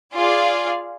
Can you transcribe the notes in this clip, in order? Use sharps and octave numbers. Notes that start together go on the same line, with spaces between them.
F4 G#4 D5 F5